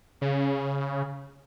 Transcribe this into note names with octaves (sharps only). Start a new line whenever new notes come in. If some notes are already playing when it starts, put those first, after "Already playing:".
C#3